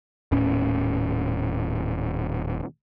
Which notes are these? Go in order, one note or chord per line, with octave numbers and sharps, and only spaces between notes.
D#1 A2 C#4